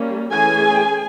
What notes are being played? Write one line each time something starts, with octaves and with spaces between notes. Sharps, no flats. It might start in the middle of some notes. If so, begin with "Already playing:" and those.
Already playing: G3 A#3 C#4
E3 A3 C#4 G#4 G#5